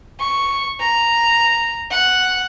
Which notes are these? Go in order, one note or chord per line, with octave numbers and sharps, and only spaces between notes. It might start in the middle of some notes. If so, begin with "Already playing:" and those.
C#6
A#5
F#5